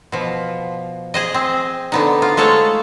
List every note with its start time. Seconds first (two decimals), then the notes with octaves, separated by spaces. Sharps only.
0.12 B2 F3
1.14 G#4 C5 D#5
1.34 C4
1.92 D3 B3 D#4
2.22 F4
2.37 G#3 A3 A4 C5 C#5 A5